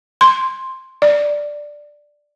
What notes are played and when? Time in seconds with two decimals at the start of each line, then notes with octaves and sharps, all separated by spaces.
0.21 C6
1.02 D5